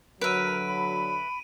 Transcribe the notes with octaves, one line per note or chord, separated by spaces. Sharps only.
D3 F#3 A#4 B4 E5 D7 D#7
B5